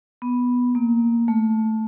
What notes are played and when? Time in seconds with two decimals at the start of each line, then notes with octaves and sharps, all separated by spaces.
0.22 B3
0.75 A#3
1.28 A3